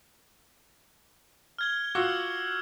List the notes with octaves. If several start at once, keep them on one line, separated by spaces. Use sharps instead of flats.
F6 G#6 G7
F4 F#4 D6 E6 F6